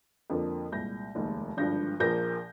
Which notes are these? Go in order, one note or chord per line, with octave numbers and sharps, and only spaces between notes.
F2 D3 F3 A#3
C2 A#2 G#3 G6 A#6
F1 D#2 D#3 G#3
G#1 G2 D3 F3 G6 A#6
A#1 A#2 F3 A#3 G6 A#6